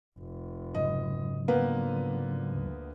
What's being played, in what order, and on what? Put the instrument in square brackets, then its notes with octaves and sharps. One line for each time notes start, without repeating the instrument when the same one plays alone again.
[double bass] F1
[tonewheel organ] G#2 C#3 F#3 [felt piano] D#5
[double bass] D3 F3 [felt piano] A#3 B3 B4
[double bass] D2